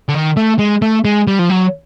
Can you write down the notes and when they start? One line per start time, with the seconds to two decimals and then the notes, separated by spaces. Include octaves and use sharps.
0.08 D3
0.14 D#3
0.37 A3
0.59 G#3
0.82 A3
1.05 G#3
1.27 G3
1.39 F3
1.50 F#3